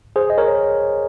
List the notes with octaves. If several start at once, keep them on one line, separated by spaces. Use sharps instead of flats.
G#4 C5
D#5
A#4 C#5